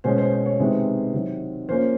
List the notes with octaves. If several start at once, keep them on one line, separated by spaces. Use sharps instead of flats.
B2 G#3 C#4 C5
C5
C5
C#5
C3 D#3 G#3 B3 C5
C3 D#3 F#3
F3 A#3 C#4 C5